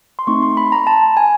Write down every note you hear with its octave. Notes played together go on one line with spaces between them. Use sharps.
C6
A3 C4 D#4 C#6
C6
B5
A#5
A5
G#5